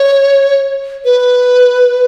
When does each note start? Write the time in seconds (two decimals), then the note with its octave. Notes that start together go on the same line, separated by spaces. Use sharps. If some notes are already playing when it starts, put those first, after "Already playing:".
Already playing: C#5
1.05 B4